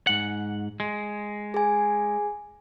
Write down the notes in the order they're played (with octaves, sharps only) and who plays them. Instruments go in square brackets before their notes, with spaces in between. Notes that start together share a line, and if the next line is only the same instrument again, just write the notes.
[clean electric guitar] G#2 F#5
G#3
[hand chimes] G#4 G#5